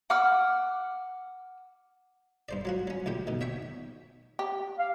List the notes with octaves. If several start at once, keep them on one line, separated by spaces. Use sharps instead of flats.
F#5 D6 E6 F6
G2 C5 D5
F#3 F4 F#4
F#3 C#4
D2 A#2 G4 G5
B2 D#3
C#5 E5 G5 C#6
G4
F5